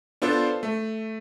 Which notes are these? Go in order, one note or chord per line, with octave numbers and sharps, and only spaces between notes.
B3 D4 F4 A4 C5
A3